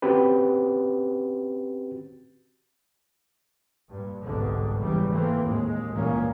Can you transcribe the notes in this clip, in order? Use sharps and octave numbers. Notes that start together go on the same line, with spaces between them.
C4 C#4 F#4 G4 B4
G2 A#2
G1 C2 G#2 B2 D3
E2 G#2 C#3 E3 G3
E3 A3 A#3 C4
D#2 A2 G#3
C#2 G2 A#2 E3 A#3 C#4